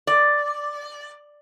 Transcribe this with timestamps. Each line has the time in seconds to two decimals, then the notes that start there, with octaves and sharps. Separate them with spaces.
0.07 D5